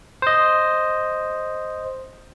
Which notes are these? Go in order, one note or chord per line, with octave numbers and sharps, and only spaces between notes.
C5 D#5